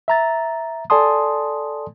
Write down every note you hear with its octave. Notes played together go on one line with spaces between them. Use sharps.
E5 A#5 A6
A4 D5 G#5 A5 C6 D#6